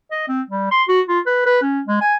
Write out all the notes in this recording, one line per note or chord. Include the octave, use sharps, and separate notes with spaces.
D#5
C4
G3
C6
F#4
F4
B4
B4
C#4
G#3
G#5